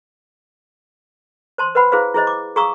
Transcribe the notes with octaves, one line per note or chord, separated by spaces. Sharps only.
C5 A5 C6
B4 C5 F#5 B5
E4 G#4 B4 C5 F5
E4 G#4 C5 D#5
D6
G#4 F5 A#5 C#6 D#6 E6